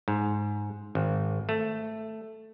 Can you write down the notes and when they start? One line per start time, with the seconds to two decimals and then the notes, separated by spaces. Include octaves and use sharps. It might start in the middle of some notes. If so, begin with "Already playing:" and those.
0.08 G#2
0.95 G#1
1.49 A3